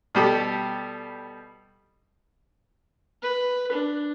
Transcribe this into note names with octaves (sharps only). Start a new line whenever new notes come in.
B2 G3 G4 A4
B4
D4